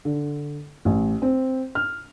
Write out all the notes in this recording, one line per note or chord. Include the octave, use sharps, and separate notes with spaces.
D3
A1
C4
F6